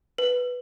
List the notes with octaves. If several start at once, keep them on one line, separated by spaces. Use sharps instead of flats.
B4